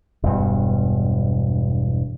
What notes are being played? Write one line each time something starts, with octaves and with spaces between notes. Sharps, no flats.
E1 G2